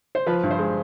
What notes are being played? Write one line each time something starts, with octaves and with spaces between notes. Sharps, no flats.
C5
F3 B4
G2
C5
G#3